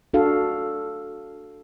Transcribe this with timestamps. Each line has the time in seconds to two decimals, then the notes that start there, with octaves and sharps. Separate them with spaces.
0.14 D4 F#4 A4 F5